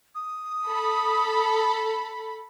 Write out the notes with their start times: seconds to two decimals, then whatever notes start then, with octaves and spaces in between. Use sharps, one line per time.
0.15 D#6
0.67 A4 B5